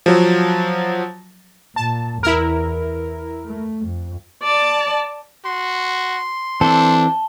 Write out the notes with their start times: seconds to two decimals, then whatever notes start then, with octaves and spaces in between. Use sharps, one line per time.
0.06 F3 F#3
1.76 A#2 A5
2.23 E2 E4 A#4
3.46 A3
3.86 F2
4.43 D5 A5
5.45 F#4 C6
6.61 E3 C4 D4 A4 A5 G7